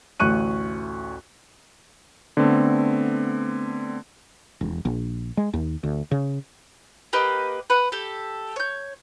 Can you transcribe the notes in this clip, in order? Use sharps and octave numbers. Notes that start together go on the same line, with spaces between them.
A1 D2 C#6 F#6 D#7
D3 A3 B3 C4
E1
A#1
G#3
D#2
D2
C#3
A#3 G4 B4 D#5
B4 F#5
G4 A4
C#5 G6